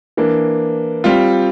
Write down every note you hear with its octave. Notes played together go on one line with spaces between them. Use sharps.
E3 A#3 D4
G3 C4 F4